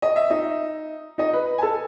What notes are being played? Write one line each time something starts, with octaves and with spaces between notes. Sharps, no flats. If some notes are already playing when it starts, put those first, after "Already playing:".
D#5
E5
D#4 D#5
D#4 D#5
B4
G#5
A4 A5